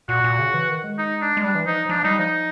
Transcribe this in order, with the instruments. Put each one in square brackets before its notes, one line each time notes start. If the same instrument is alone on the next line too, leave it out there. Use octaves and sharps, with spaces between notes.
[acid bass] A#2 [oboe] F#4
[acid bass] A#2
C#3
E3
D#3
G#3
[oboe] D#4
D4
[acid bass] G#3
[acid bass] G3 [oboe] D4
[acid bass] E3
[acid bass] F3 [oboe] D#4
[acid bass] F3 [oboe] D4
[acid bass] G3 [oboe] D#4
[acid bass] F3 [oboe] D#4